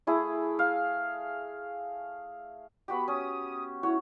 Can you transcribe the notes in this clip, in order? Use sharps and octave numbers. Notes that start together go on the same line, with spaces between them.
A3 E4 G#4
F5
B3 F#4 G4 B5
C#4 D#6
E4 F#4 C#5